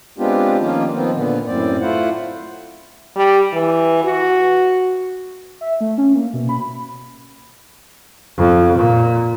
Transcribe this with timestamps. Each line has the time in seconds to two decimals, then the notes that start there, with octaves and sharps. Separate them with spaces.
0.18 G#3 B3 C4 D4 F4 G4
0.60 D#3 F3 A#3 C#4 F4
0.94 D#3 F3 B3 C4
1.14 A#2 D3 B3
1.47 F#2 A2 C4 D5
1.81 A3 E4 F4 C5 F#5
3.16 G3
3.53 E3
4.04 F#4
5.61 E5
5.81 A3
5.98 C#4
6.15 A#3
6.33 B2
6.49 B5
8.38 F2
8.78 A#2